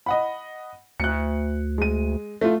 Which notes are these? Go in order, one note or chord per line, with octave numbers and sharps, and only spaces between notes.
D#5 F#5 B5
D2 F#6 C#7
G#3 D#7
A3 F4